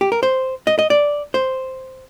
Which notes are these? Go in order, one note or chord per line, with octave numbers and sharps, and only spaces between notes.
G4
A#4
C5
D#5
D#5
D5
C5